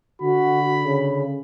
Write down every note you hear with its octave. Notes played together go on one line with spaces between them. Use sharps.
D3 F#4 B5
C#3